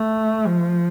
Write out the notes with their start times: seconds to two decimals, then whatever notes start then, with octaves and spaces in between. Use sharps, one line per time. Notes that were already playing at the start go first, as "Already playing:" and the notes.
Already playing: A3
0.47 F3